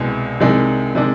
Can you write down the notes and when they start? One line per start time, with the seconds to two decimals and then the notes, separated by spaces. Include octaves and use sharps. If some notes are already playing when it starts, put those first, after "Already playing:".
Already playing: C2 B2 G#3
0.40 C2 C3 D#3 G#3 D4
0.95 C3 D#3 G#3 D4